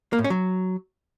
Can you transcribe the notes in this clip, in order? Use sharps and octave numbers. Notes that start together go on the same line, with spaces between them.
A#3
A2
C#4
F#3